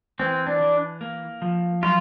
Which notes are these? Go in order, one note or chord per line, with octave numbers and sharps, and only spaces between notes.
E3 C4
D4
E3
A#3
F3
F#3 F4